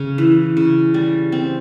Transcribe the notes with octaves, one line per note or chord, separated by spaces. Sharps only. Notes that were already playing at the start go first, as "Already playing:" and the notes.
Already playing: C#3
E3
C#3
G3
C4